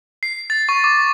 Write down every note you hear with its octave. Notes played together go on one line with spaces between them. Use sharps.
C7
A6
C#6
D6